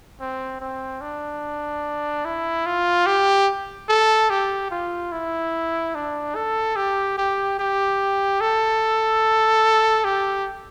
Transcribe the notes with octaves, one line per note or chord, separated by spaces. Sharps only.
C4
C4
D4
E4
F4
G4
A4
G4
F4
E4
D4
A4
G4
G4
G4
A4
G4